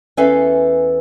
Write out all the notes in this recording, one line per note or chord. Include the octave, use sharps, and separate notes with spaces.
E2 C#4 A4 B4 E5 F5